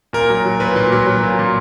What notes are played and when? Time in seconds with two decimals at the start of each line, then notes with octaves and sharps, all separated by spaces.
0.13 A#2 A#4
0.30 F#3
0.45 F#3
0.60 A#2 B4
0.76 A#2
0.92 F#3
1.07 F#3
1.23 A#2
1.39 A#2